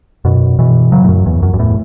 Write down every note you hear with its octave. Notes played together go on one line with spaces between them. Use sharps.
F#2 B2
B2 E3
C#3 F#3
A2
F#2
E2
F#2
F#2
E2 A2